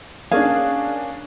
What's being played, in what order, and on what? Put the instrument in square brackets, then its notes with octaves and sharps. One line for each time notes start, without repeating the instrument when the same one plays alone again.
[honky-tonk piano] A#3 C#4 D4 [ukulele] G#4 F5